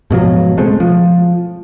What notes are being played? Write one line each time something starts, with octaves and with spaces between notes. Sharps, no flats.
G#2 B2 F3 F#3
C#2 G#3 A3 C4
F3